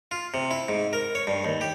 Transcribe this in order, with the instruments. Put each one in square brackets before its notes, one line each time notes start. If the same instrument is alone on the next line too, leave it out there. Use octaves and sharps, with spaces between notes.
[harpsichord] F4
C3
E4
G#2
A#4
C#5
G2
D#2
G4